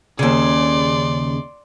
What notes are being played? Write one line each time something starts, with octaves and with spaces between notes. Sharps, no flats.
D#2 C#3 D5 C6